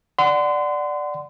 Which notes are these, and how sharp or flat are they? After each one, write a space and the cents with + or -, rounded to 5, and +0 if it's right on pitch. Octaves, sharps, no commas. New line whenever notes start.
D5 +0 F#5 +5 C6 -35